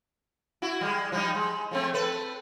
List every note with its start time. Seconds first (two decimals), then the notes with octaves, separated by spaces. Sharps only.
0.62 E4 F#4
0.81 G3 G#3
1.12 F3 G3 D#4
1.35 G#3
1.71 F3 A3 C4
1.93 C4 A4 B4